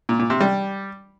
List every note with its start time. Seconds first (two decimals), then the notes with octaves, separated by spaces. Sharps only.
0.09 A#2
0.19 A#2
0.30 C3
0.40 G3